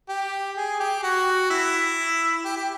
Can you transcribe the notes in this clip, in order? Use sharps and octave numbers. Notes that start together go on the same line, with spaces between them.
G4
G#4
G4
F#4
E4
G4
G4